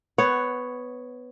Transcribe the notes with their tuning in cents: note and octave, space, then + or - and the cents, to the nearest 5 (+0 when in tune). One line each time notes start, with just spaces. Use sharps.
B3 +10 C#5 +0 F#5 +0